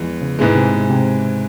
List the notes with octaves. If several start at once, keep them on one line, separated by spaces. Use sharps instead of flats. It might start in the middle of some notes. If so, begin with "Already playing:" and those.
Already playing: E2 E3 F3 G#3
C#3
G#2 C3 E3 G#3
C3
B2
C3